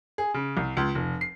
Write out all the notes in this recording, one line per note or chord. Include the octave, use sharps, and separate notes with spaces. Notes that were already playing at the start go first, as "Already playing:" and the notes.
G#4
C#3
C2
C#2
F1
C7